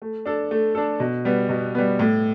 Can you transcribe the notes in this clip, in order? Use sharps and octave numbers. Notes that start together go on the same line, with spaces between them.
A3
D4 A4
A3
D4 A4
B2
G3 B3
B2
G3 B3
A2